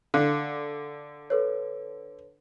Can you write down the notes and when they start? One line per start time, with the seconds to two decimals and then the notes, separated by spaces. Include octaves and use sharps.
0.14 D3 F5 F#6
1.30 A4 B4 C#5